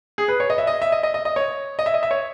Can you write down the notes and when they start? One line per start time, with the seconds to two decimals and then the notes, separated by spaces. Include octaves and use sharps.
0.18 G#4
0.28 B4
0.40 C#5
0.50 D#5
0.58 E5
0.67 D#5
0.82 E5
0.92 D#5
1.03 D#5
1.14 D#5
1.25 D#5
1.36 C#5
1.79 D#5
1.86 E5
1.94 D#5
2.03 E5
2.11 C#5